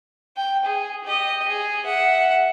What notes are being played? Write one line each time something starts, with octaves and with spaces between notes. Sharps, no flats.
G5
G#4
G4 D#5
G#4
E5 F#5